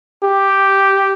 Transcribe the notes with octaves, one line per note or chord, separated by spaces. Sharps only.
G4